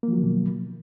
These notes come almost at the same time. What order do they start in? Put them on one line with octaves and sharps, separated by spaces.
A#3 F3 F#3 D#3 B2